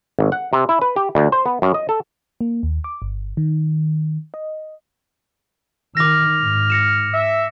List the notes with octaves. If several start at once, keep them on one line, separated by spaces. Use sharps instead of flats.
G#1
F#5
C3
E4
B4
G4
D2
C5
B3
F#2
D#5
A4
A#3
D#2
D6
G1
D#3
D#5
D#3 D6 F6 A#6
G#2
A#6 C#7 E7
E5